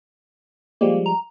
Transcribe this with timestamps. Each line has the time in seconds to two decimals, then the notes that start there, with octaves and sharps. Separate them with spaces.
0.81 F3 G3 G#3 A#3
1.06 A#5